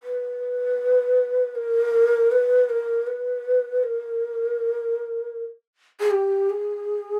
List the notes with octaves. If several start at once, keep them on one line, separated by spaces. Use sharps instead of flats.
B4
A#4
B4
A#4
B4
A#4
G#4
G4
G#4